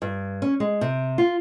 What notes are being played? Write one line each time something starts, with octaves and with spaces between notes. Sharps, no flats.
G2
C#4
G#3
C3
F4